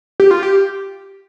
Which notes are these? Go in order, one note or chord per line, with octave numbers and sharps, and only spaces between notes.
G4
F4
G4